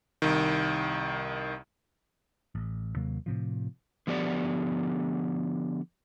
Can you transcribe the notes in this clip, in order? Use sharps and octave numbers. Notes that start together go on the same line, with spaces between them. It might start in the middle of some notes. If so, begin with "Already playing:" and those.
C2 D#3
A1
D#2 C3 F#3 A#3
A2 C3 F3
D3 F3 B3 G4 D5 F#5